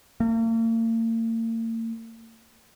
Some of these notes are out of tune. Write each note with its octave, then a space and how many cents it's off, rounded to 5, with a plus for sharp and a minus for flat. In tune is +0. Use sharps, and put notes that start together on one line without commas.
A#3 -45